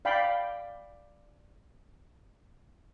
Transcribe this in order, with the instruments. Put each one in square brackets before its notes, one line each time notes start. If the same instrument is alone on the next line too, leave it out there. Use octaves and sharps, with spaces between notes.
[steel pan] D5 F5 G5 B5